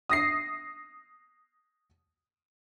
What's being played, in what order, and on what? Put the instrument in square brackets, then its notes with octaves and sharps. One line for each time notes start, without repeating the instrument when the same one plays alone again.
[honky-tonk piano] D#6 A#6 C7